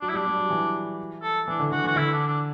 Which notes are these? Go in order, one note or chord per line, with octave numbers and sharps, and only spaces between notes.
F#3 D4
E4
G3 D4
G3
F#3
E3
A4
E3 D4
D3
D3 F#4
E3 F#4
D3 E4
D4
D4